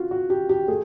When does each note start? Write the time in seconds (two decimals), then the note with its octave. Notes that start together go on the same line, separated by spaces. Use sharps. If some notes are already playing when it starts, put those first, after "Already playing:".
Already playing: F4 F#4
0.11 F#4
0.30 G4
0.49 G4
0.68 A3 G#4